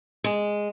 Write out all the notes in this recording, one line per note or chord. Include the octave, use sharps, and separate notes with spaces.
G#3